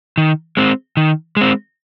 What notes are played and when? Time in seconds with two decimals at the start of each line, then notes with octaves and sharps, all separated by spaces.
0.18 D#3
0.57 G#3 C4
0.97 D#3
1.37 G#3 C4